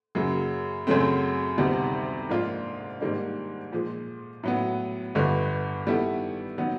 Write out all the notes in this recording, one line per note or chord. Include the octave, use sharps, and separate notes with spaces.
F#2 C#3 F#3 A#3
F#2 C#3 F#3 A3 C4
D2 C3 D#3 G3 B3
G#2 F3 A#3 D4 F4
G#2 D#3 G3 A#3 D4
A#2 F3 G#3
A2 F#3 B3
G1 G2 D3
D#3 G3 B3 E4 A4
D#3 F#3 B3